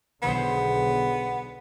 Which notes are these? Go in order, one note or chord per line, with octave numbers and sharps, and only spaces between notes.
B1 D3 D#3 B3 G#4 C5